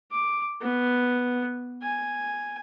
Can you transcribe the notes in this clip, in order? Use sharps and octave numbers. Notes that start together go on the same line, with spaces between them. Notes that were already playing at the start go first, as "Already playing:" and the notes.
D6
B3
G#5